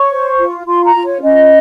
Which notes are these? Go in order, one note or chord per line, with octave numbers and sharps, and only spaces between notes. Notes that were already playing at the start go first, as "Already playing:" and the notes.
Already playing: C#5 C#6
C5
F4
F4 C6
A#5
F4
C#5
C#4 D#5